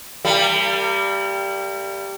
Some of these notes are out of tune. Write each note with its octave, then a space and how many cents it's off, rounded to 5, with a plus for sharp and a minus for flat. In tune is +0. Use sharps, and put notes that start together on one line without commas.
G3 +0 A#3 -40